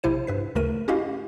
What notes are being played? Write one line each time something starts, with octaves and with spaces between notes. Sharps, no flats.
A#1 C3 E4 C5 D#7
G2 B4 B6
D2 C#3 A3 A#4 D#7
C#4 E4 F#4 G4 D#5 F5